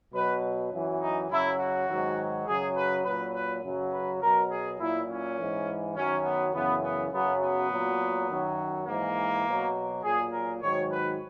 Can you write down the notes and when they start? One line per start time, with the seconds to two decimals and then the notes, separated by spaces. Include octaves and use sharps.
0.14 B2 F#3 B4
0.72 F#2 E3
1.01 D#4
1.30 F#2 C#3 F#3 E4
1.59 F#4
1.89 G#2 D#3 F#3
2.46 F#2 C#3 F#3 G#4
2.76 B4
3.04 A#2 F#3 B4
3.34 B4
3.63 F#2 C#3 F#3
3.92 B4
4.22 B2 F#3 A#4
4.50 G#4
4.79 A#2 F#3 E4
5.09 C#4
5.37 G#2 E3
5.95 F#2 D#3 F#3 C#4
6.25 B3
6.54 F#2 C#3 E3 B3
6.83 B3
7.12 F#2 C#3 F#3 B3
7.42 B3
7.70 A#2 F#3
8.29 F#2 D#3 F#3
8.87 G#2 E3 A#3
9.46 B2 F#3
10.03 A#2 F#3 G#4
10.32 A#4
10.62 G#2 D#3 F#3 C#5
10.91 B4